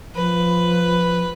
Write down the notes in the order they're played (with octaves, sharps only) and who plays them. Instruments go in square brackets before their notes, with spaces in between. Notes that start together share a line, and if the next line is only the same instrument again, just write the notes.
[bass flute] F3 [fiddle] B4